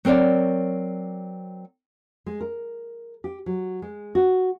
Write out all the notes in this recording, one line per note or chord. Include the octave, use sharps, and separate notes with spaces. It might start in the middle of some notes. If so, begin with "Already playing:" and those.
F#3 C4 A#4 C#5 D5
G#3
A#4
G4
F#3
G#3
F#4